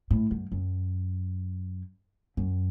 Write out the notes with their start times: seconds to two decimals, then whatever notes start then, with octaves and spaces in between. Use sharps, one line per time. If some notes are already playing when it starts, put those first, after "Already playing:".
0.11 A2
0.31 F#2
0.52 F#2
2.37 F#2